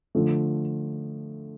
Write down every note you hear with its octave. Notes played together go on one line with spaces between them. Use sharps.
D3 F3 A3